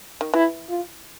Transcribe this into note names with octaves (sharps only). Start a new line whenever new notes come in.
D#3
E3 E4
F4